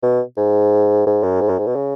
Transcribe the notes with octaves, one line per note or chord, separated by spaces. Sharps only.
B2
G#2
G#2
F#2
G#2
F#2
G#2
B2
C#3